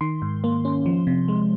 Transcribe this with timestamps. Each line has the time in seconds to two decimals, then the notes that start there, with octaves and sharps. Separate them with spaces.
0.01 D#3 C6
0.22 G#2
0.44 A#3
0.65 C#4
0.86 F3
1.07 C3
1.28 G#3